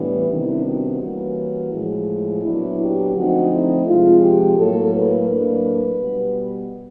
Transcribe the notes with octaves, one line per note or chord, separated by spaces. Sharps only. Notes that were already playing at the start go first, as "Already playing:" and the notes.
Already playing: A2 E3 G3 B3 D4
C3 D#3 G3 B3 D4 E4
F#4
E3 G3 A#3 C#4
A2 F3 G#3
A#2 F#3 B3 D4 E4
G4
D3 F3 A3 C4 D#4 F#4
E4
C3 F3 G#3 F4
G4
A2 F#3 A#3 A4
B4
A2 F#3 A#3 D4
B2 G3 B3